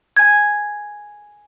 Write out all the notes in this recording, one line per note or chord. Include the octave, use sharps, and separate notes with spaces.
G#5 G#6